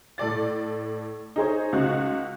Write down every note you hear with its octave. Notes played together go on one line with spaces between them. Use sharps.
A2 A4 D5 A6
D#4 G#4 C5 C#5
C#2 F#4 F#6